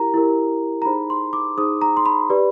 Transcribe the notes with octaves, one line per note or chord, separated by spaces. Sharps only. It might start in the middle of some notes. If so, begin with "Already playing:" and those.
Already playing: E4 G4 A#4 A#5
E4 G4 A#4
A#5
D#4 G#4 C5 B5
C6
D6
D#4 G#4 C5 D#6
A#5
C6
B5
G4 B4 D5